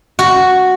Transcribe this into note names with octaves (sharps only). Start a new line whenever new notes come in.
F#4